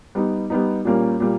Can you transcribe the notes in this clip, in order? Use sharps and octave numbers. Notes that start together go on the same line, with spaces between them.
G3 B3 D#4
G3 B3 D#4
A#2 G3 A#3 C#4
A#2 G3 A#3